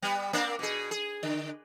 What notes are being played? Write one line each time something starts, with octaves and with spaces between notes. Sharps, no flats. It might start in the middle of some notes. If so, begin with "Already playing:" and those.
G3 B3
A#3 C4 D4
B2 G#4
G#4
D3